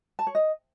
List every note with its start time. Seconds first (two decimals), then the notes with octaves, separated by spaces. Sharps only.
0.19 A5
0.27 C#5
0.35 D#5